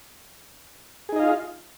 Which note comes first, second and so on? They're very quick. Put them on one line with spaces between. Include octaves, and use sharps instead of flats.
G#4 D#4 D#5 F5 F4